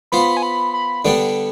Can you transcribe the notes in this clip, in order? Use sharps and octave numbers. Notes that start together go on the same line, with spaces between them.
B3 F4 C5 B5
G#5
B5
B5
D3 G3 B3 D4 G4